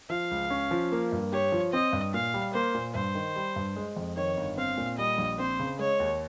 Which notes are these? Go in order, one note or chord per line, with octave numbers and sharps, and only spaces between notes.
F3 F5
C#2
C#4
F3
A#3
G2
G4 C#5
F3
C4 D#5
G2
A#2 F5
G3
A#3 C5
A#2
G2 C5
D#3
G3
G2
G#3
F2
D#3 C#5
G1
C4 F5
A#2
G3 D#5
A#1
C4 C5
C#3
G#3 C#5
D#2